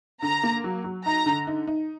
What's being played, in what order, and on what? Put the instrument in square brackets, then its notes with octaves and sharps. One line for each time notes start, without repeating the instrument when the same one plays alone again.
[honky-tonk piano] D3 [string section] A#5
[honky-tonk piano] A#3
F#3
F#3
[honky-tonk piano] D#4 [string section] A#5
[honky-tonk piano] D3
D#4
D#4